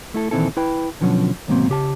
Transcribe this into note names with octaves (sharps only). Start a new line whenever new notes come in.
A3 E4 A4
A#2 D#3 E3 C4 E4 A4
E4 B4 G5 B5
B2 D3 F3 F#3 C#4
D#2 G#2 B2 F#3 A#3 C4
C#3 G4 A5